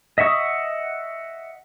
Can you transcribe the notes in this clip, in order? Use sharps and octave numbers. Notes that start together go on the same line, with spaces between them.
D#5 E5 F#5 C#6 D#6